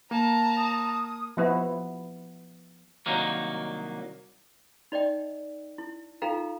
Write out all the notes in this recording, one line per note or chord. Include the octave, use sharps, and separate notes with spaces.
A#3 A5 A#5
D#6
F3 B3 E4
C2 D#3 F#3 A#3
D#4 D5 D#5 G5
E4
D#4 F4 A4 F5 G5 A#5